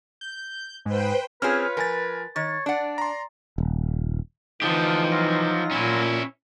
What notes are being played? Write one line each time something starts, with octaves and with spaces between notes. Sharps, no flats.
G6
G#2 B4 C5 G5
C4 C#4 F4 G#4 B4 C#5 F6
F3 A#4 G#5 A6
D#3 C#5 A6
D4 D5 F#5
A#5 C6
D#1
D3 E3 F3 D#4 G4 A5 D#6
F#3 F4 A#6
A#2 C#4 E4